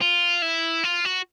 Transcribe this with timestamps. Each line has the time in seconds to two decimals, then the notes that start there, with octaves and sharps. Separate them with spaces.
0.01 F4
0.42 E4
0.84 F4
1.05 F#4